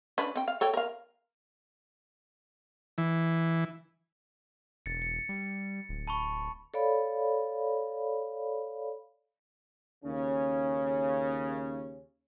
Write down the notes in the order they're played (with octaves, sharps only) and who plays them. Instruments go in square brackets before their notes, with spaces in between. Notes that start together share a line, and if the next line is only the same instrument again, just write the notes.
[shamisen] C#4 D4 B4
C4 G5
F5
A4 C#5 G5
A#4 F5
[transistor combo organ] E3
[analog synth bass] E1 [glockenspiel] A6 C#7
[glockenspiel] C#7
[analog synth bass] G3
D1
[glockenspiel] A5 B5 C#6
[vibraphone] A4 C#5 D5 F5 B5
[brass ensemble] D#2 C#3 C#4